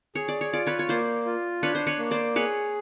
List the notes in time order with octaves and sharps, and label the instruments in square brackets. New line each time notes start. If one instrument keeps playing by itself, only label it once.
[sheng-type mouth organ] G#4 [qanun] C#5
[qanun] D5
C#5
[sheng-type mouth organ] F4 [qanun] D5
[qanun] B4 C#5
C#5
[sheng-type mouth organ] A#3 [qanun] C5 D5
[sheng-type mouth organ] F4
[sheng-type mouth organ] D4 [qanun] B4 C#5
[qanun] C5
B4 C#5
[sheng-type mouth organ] A#3
[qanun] C5 D5
[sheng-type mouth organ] G#4 [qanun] B4 C#5